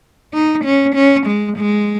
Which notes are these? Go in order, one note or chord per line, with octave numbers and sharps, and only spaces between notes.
D#4
C#4
C#4
G#3
G#3